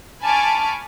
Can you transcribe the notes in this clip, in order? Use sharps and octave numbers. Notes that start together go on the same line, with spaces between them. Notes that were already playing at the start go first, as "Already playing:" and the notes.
G#5 A5 B5 C#6 D6 F6